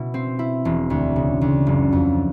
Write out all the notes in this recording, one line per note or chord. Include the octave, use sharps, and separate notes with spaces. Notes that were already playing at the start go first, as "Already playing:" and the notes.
Already playing: B2 E4
C4
E4
E1
D2
C#3
D2
F#1
F2